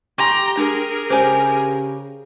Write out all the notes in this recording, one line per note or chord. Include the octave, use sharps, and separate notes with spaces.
G4 G#5 A#5 C6 C#6
D4 G#4 A#4
C#3 G4 C5 C#5 G#5